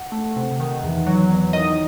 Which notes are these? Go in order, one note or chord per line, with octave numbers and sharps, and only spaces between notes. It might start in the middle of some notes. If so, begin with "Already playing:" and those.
Already playing: F#5
A3
C3
D#3
E2
F#3
E2
D#3 D#5